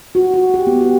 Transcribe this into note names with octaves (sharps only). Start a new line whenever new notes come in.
F#4
F#4
G4
B3
G4